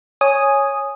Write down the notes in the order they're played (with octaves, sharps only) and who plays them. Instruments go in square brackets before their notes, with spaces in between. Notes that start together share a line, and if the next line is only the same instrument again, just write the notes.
[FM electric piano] C#5 G#5 D#6